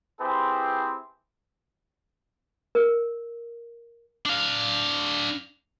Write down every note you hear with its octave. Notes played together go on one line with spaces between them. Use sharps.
C4 E4 G4 G#4 B4 C5
A#4
D4 F5